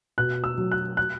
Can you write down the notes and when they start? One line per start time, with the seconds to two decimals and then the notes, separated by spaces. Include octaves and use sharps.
0.18 B2 F#6
0.44 E6
0.58 F#3
0.72 F#6
0.97 F#6